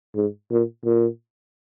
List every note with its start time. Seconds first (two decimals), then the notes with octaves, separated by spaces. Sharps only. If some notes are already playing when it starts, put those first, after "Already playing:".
0.16 G#2
0.51 A#2
0.85 A#2